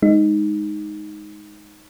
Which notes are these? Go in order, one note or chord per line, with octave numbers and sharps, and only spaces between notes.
G#3 D#4